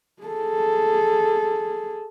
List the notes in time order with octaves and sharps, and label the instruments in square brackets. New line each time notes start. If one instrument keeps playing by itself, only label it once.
[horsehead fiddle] G#4 A4